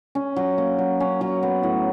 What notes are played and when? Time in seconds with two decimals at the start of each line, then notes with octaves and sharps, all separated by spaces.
0.15 C#4
0.36 F#3
0.58 A#3
0.78 F#3
1.00 C#4
1.21 F#3
1.43 B3
1.63 A2